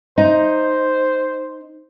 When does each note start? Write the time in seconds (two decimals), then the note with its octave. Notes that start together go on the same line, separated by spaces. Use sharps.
0.18 D#4 C5